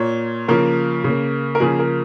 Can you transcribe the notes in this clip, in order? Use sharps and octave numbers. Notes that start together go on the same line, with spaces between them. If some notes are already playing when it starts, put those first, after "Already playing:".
Already playing: A#2 A#3 C#5
C#3 F3 A#3 A#4
C#3 A#3
A#4
C#3 F3 A#3 G#4
A#4